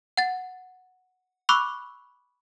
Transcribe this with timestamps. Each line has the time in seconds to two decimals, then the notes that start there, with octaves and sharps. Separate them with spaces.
0.17 F#5 A6
1.49 B5 C#6 D6 E6 F#6